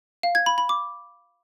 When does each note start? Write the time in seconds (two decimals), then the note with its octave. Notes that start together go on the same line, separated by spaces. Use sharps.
0.23 F5
0.35 G#6
0.46 B5
0.58 B5
0.69 D6